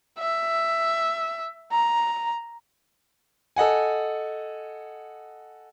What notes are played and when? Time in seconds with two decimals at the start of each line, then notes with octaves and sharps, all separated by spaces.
0.19 E5
1.72 A#5
3.56 A4 D#5 F#5 G#5